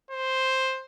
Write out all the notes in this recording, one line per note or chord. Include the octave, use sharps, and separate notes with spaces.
C5